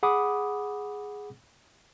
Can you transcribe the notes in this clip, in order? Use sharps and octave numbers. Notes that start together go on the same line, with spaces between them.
G#4 F#5 B5 D6 D#6